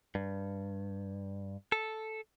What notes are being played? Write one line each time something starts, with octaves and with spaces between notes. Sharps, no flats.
G2
A4